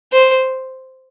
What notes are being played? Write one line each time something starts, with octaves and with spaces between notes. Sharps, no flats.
C5